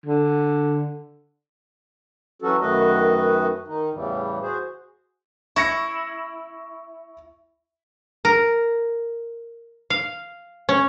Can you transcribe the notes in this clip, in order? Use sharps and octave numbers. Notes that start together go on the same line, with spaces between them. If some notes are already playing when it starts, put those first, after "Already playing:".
D3
E3 F#3 C#4 F#4 A4
F#2 D#3 A3 F#4 B4 D#5
D#3 D#4
E2 A2 C#3 E3 G3
F#4 G#4 C5
E4 C#6 A#6 C#7
A#4
F5
C#4